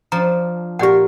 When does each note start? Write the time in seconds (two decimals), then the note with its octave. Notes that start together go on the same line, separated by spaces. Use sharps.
0.12 F3 D4 A#5
0.79 A#2 G4 A#4 D5 F#5